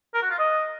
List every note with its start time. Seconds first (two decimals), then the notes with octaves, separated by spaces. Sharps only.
0.14 A#4
0.22 F#4
0.30 F4
0.39 D#5